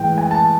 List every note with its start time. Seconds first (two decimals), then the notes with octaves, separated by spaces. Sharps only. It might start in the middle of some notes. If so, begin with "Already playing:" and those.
Already playing: A2 E3 G#3 G5
0.18 G#5
0.31 A5